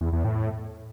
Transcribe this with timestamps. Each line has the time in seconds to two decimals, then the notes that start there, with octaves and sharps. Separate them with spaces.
0.01 E2
0.13 E2
0.24 A2